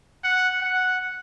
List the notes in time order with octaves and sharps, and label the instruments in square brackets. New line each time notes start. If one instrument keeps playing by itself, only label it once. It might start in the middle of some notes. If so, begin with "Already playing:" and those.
[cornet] F#5
F#5